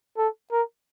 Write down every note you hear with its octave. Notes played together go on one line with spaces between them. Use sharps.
A4
A#4